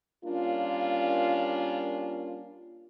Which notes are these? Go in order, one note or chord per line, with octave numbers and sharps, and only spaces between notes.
G3 A#3 C#4 D4 F4